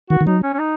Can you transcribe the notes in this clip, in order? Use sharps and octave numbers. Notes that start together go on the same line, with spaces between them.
D#3 F#4
D#3
F#3 D#4
C#4
C#4
D#4